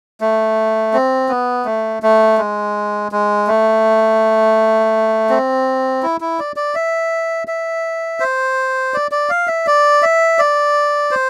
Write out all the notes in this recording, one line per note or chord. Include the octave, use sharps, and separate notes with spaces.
A3
C4
B3
A3
A3
G#3
G#3
A3
C4
E4
E4
D5
D5
E5
E5
C5
D5
D5
F5
E5
D5
E5
D5
C5